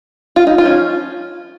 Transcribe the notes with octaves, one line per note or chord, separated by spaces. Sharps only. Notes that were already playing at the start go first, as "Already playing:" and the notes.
F4
D#4
F4
F3 C#4